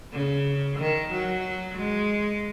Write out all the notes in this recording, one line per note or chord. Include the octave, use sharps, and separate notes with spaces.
C#3
D#3
F#3
G#3